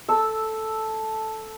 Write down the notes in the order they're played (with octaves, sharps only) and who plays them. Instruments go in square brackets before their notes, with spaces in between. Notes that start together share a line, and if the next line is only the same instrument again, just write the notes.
[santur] A4 E6